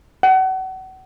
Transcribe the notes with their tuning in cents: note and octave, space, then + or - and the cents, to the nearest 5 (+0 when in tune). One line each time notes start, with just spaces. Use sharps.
F#5 +35